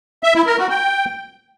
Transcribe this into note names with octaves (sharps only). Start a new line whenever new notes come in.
E5
E4
A#4
F#4
G5